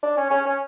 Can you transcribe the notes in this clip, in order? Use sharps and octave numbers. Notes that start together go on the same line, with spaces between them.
D4
C#4
C#4
C#4